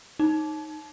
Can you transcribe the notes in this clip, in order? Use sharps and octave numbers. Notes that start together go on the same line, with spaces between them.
D#4